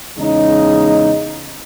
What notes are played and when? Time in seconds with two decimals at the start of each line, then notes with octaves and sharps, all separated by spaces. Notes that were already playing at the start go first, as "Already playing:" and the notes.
0.17 E2 C#3 G#3 D#4